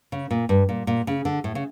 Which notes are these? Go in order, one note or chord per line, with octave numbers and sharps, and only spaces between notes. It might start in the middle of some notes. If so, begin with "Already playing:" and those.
C#3
A#2
G2
A#2
A#2
C#3
D3
A2
C#3